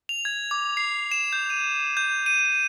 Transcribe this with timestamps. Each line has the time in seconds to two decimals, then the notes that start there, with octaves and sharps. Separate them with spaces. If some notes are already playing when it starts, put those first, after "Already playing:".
0.09 F7
0.25 G#6
0.51 D6
0.77 C7
1.11 E7
1.33 G6
1.50 D#7
1.97 G6
2.26 D#7